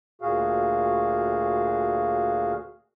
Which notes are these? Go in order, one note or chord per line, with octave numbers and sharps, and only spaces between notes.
D2 A#2 F#4 G#4 F5